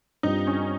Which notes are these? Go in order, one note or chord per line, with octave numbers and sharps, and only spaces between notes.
G2 G3 C4 D#4 F4
C#4